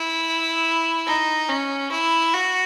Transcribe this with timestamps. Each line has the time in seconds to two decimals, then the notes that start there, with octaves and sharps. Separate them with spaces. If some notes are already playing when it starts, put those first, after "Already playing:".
Already playing: E4
1.07 D#4
1.49 C#4
1.91 E4
2.34 F#4